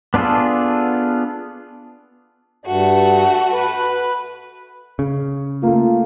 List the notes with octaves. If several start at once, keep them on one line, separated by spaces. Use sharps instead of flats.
B3 D4 F4 G#4 A4
G2 A3 F#4
B4
C#3
A3 A#3 F4